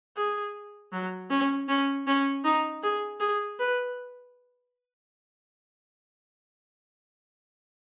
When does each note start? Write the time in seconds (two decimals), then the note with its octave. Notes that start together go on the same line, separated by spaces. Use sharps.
0.17 G#4
0.92 F#3
1.30 C#4
1.68 C#4
2.07 C#4
2.44 D#4
2.83 G#4
3.20 G#4
3.59 B4